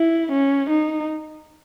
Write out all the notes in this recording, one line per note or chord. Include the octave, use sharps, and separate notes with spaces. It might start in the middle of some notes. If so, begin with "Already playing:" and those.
Already playing: E4
C#4
D#4